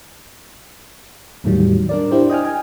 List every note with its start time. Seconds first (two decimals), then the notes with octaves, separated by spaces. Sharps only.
1.44 E2 A2 D#3 F#3 G3
1.89 D4 A#4 D5
2.11 D4 E4 G4 C5
2.30 D#5 G5 G#5 F6
2.44 G5 G#5